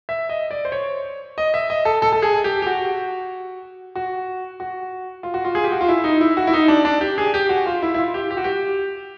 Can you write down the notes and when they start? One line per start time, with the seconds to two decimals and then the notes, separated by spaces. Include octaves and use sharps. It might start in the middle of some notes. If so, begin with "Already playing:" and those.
0.09 E5
0.29 D#5
0.51 D5
0.65 C5
0.72 C#5
1.38 D#5
1.54 E5
1.70 D#5
1.85 A4
2.02 A4
2.13 A4
2.22 G#4
2.44 G4
2.62 G4
2.67 F#4
3.95 F#4
4.60 F#4
5.23 F4
5.34 F#4
5.45 F4
5.55 G#4
5.64 G4
5.71 F#4
5.81 F4
5.88 E4
6.04 D#4
6.21 E4
6.37 F#4
6.47 E4
6.53 D#4
6.68 D4
6.85 D4
7.01 G4
7.18 G#4
7.34 G4
7.49 F#4
7.66 F4
7.82 E4
7.94 E4
7.98 F4
8.14 G4
8.31 G4
8.37 F#4
8.44 G4